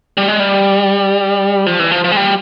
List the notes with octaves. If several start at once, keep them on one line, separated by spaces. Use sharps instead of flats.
G3
G#3
G3
F3
E3
F3
F3
G#3
G3